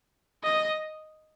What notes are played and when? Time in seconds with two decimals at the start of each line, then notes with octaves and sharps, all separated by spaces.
0.43 D#5